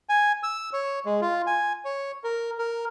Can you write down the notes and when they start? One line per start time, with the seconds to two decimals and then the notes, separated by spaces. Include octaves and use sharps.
0.09 G#5
0.43 E6
0.73 C#5
1.05 G#3
1.21 F4
1.47 G#5
1.85 C#5
2.24 A#4
2.59 A#4